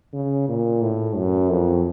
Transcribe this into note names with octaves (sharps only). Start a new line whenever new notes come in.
C#3
A#2
A2
F#2
F2